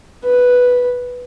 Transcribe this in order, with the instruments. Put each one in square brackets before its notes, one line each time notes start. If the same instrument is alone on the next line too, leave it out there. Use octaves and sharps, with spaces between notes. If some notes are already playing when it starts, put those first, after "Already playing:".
[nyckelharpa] B4